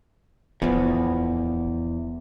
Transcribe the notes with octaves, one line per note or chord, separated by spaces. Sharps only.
D1 E2 F3 B3